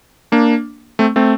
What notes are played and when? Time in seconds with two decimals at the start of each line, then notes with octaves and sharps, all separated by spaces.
0.32 A#3 D4
0.99 A3 C4
1.16 A3 C4